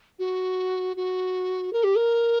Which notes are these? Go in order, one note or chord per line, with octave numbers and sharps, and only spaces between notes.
F#4
F#4
A#4
G4
A#4